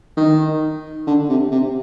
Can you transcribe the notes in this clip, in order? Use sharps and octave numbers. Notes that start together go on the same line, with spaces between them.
D#3
D3
C3
C3